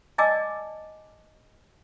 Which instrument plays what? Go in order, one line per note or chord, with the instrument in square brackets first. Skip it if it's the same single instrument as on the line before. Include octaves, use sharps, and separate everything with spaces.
[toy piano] D5 D#5 G#5 A5 D6 E6